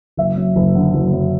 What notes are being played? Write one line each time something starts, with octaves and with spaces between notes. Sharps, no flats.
F#1 E5
F#2
F#1
D3
F#1
F#2